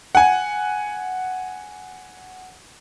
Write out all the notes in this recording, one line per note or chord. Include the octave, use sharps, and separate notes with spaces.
F#5 G#5